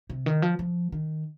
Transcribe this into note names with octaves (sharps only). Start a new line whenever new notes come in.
C3
D#3
F3
F3
D#3